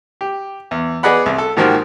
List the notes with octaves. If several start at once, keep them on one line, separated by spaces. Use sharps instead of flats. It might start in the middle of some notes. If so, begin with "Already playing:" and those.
G4
E2
B3 G#4 D5 D#5 F#5 B5
C2
A4
G#2 D#3 F3 A#3 F#4 G4